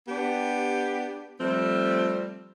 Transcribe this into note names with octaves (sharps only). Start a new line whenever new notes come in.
B3 D4 G4
F3 G3 A3 C4